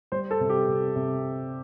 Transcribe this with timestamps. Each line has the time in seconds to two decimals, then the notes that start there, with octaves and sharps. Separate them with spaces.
0.12 G3 C5
0.31 A4
0.40 C3
0.49 G4
0.68 C3
0.96 C3